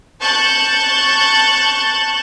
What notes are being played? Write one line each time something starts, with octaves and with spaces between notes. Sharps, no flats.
A5 C#6 F#6 G6 A6